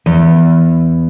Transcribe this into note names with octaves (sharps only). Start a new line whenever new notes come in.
E2